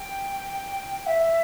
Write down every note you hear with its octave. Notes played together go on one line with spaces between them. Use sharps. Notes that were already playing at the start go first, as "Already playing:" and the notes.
Already playing: G5
G5
E5